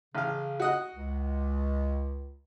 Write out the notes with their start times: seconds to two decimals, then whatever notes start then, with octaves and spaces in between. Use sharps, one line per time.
0.15 A1 C#3 F5
0.60 F#4 D#5 F#5
0.94 C#2